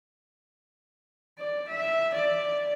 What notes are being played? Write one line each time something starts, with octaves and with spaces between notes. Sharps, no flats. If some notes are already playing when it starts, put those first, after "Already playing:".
D5
E5
D5